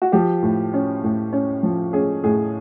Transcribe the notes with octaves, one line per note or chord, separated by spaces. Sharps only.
F#4
F3 G4
A2
C#4
A2
C#4
F3
C#4 G#4
A2 G#4